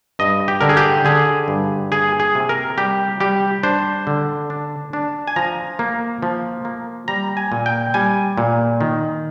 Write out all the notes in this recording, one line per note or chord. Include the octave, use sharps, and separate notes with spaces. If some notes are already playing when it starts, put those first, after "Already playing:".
G2 D#5
G4
D3 A#4
G#4
G4
D3 G#4
G2
A#3 G#4
G#4
C3
A#4
G3 G4
G3 G4
D4 C5
D3
D4
D4
G#5
F3 A#5
A#3
F3
A#3
G3 A#5
G#5
A#2
G5
G3 G#5
A#2
D#3